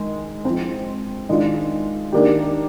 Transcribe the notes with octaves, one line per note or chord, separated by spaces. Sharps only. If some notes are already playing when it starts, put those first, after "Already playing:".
Already playing: D#3 G#3
F3 G#3 C4
D#3 G#3 D4 F4
D#3 A#3 D4 G4